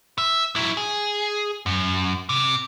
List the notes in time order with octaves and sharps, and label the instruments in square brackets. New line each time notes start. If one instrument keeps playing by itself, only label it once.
[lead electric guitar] E5
F#3 E4
G#4
F#2
C3